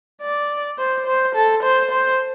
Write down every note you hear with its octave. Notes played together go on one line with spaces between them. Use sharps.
D5
C5
C5
A4
C5
C5